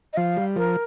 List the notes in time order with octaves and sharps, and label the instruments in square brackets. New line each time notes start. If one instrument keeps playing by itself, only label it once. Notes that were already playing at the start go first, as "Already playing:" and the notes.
[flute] D#5
[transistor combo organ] F3 [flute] F5
[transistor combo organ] G3
[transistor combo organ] F3 [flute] A#4